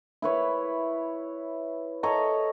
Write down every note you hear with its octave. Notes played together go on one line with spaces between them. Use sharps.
E4 B4 C#5
A4 C#5 D#5 A#5